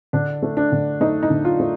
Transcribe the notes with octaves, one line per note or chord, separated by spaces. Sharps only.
D3 D4
A3
D4
D3
A3 D#4
D#4
D3
F4
A3